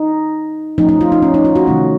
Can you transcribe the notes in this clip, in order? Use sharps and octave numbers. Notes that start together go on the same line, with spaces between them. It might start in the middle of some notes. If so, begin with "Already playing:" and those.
Already playing: D#4
F3 A3 C#4 D#4
D#4
F4
D#4
C#4
D#4
F4
F#4
C3 D#3 F#3 A3 C#4